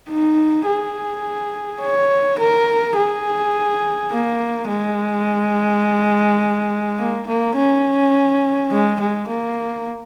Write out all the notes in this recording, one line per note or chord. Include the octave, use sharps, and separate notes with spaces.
D#4
G#4
C#5
A#4
G#4
A#3
G#3
A#3
A#3
C#4
G#3
G#3
A#3